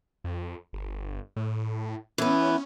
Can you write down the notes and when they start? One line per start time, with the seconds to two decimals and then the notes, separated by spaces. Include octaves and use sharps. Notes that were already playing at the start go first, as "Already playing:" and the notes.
0.24 F2
0.73 G1
1.36 A2
2.18 E3 B3 C#4